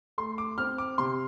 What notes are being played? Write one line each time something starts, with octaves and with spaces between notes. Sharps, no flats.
A3 C6
D6
C4 F6
D6
C3 C6